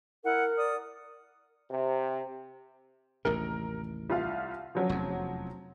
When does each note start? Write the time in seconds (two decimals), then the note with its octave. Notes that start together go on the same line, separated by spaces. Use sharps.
0.24 E4 A#4 F#5
0.57 D5 D#6
1.71 C3
3.25 A1 D#2 C3 A#4
4.10 C2 F4 F5
4.75 F3 F#3 C#4
4.89 F1 E2